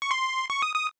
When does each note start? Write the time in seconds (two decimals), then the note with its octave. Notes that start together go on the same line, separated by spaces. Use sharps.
0.02 C#6
0.11 C6
0.50 C#6
0.62 D#6
0.75 D#6